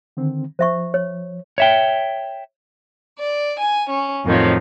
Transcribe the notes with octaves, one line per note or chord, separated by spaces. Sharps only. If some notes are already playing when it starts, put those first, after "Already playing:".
D3 D#3 C4
F3 C5 E5 C#6
C#5
C#5 E5 G5
D5
G#5
C#4
F2 A2 D#3 F3 F#3